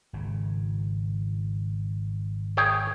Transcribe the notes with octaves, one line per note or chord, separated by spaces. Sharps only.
G#1 C#3
G#4 C#5 G5